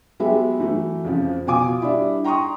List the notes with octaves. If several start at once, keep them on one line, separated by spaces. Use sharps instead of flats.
F#3 G#3 B3 G4 G#4 E5
E3 F#3 A3
F2 C#3 F3
B2 F4 G#5 D6 D#6
G3 D4 E4
G5 A#5 C6 C#6 D#6